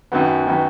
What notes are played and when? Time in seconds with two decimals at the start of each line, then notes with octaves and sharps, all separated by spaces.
0.12 F#2 D#3 F#3 B3
0.47 D#3 F#3 B3